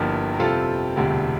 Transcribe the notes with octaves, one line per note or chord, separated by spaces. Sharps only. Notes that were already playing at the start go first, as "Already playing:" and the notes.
Already playing: G1 G2 F3 A#3 E4 G4
A#4
F2 C3 G3 C4 F4 A4
E1 D2 C3 G3